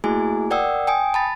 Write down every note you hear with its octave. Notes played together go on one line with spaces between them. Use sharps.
A3 A#3 E4 F#4 G#4 G#5
A#4 D5 F#5 G5 D#6 E6
G5 G#5 D#6
A5 B5 A6